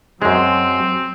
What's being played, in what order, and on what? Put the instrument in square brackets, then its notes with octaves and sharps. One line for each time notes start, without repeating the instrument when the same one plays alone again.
[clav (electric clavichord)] F#2 G#3 [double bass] F#3 [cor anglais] C4